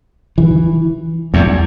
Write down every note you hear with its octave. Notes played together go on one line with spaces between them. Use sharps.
E3
E2